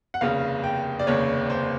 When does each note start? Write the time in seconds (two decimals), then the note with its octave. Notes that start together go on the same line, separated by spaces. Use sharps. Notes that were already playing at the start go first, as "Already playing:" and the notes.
0.14 F#5
0.21 F1 D#2 C#3 F5
0.64 G5
0.99 D5
1.07 F1 D#2 C#3 C#5
1.50 C5